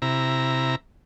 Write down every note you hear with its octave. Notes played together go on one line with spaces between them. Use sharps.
C3 E4 A#5